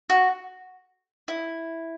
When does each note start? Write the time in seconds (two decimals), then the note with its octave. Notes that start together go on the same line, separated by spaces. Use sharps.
0.10 F#4
1.28 E4